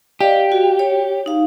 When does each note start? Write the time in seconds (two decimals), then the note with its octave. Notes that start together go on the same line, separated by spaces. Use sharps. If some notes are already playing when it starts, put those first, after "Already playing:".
0.21 G4 D5 D#5 F5
0.52 F#4
0.79 C#5
1.26 D#4 F5